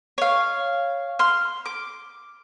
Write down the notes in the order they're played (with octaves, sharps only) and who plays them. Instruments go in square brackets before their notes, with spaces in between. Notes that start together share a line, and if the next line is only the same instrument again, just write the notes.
[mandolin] C#5 F5
C6 F6
D6